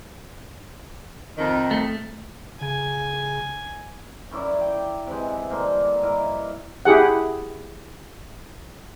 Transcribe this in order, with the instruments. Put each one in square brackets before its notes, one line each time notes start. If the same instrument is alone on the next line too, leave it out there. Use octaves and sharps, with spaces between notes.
[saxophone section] F2 D#3
[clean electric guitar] A3
[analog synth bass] C#3 [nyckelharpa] G#5
[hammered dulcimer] F#2 E4 D5 A#5
G5
C3 E3 G#3
G2 D3 A#3 C5
A#5
E4 A#4 D#5
[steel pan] E4 G4 G#4 F#5